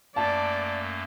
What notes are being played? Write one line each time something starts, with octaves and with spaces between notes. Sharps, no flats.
F#2 A3 A#3 D5 A5